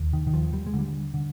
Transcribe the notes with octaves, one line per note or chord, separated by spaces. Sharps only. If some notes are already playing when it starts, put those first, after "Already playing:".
Already playing: D#2
D#3
D#3
D#2 F3
G3
G#3
D3
G3
D3